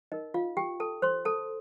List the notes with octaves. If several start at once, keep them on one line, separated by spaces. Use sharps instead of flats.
D#4 A#4 D#5
F4 F5
G4 G5
A4 A5
C5 C6
A4 A5